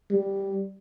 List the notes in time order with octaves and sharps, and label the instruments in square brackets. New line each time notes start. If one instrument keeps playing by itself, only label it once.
[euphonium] G3